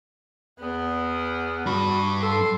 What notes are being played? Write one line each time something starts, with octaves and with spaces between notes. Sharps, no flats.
E2 B3
G2 F#4 B5
A4 C6